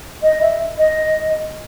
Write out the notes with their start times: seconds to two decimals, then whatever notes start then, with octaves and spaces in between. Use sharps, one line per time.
0.22 D#5
0.42 E5
0.78 D#5